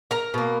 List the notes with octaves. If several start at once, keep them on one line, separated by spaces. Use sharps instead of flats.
A#4 A#5
B2 A#3